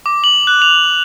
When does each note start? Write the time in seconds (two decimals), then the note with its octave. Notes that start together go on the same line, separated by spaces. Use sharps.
0.06 D6
0.24 F#7
0.47 F#6
0.62 F7